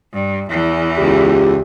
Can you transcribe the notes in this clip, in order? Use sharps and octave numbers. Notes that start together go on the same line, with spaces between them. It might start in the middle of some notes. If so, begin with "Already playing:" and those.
G2
E2 E3
C#2 G4